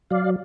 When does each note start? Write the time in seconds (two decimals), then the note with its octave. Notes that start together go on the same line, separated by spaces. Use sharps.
0.10 F#3 D5 F5